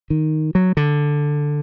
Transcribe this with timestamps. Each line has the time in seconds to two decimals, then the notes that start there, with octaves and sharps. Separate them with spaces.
0.10 D#3
0.55 F#3
0.77 D3